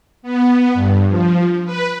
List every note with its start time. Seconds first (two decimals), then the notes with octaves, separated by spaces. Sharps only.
0.22 B3
0.74 G2
1.09 F3
1.65 B4